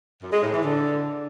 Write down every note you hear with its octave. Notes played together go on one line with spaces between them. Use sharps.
F#2
G#3
A2
E3
D3